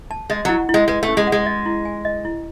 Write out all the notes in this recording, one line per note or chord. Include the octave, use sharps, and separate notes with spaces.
A5
G#3 D#5
F#3 E4
E4
G#3
G#3 B4
A3
C#4
G#3
F#5
G#3
D#5
E4
G#5
D#5
E4